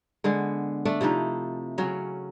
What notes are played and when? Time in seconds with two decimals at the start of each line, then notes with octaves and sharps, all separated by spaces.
0.24 D3 G#3 B3
0.85 A3 D4 A4 D5
1.01 C3 F3 D#4 E4
1.78 C#3 F#3 C#4